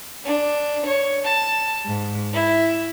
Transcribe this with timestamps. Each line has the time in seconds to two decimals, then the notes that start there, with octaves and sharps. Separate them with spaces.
0.24 D4
0.85 C#5
1.23 A5
1.86 G#2
2.33 E4